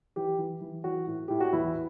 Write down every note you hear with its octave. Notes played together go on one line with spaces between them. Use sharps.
E3 G4
E3
E3
E3 F#4
A2
A2 G4
F#4
E2 E4